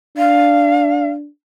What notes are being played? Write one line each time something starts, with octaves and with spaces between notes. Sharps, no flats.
D4 F5